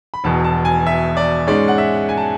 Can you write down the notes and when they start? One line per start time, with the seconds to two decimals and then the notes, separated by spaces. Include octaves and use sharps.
0.14 B5
0.24 E1 E2 B2 A5
0.44 A5
0.65 G#5
0.86 E5
1.17 D5
1.47 G#2 G#3 C#4 D5
1.68 F#5
1.78 E5
2.09 G#5
2.17 A5